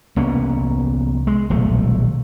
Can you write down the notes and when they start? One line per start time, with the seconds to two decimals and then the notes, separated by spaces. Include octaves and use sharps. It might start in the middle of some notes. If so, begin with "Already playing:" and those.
0.16 C2 A#3 B3 C#4
1.27 G#3
1.50 D#1 B1 F3 A3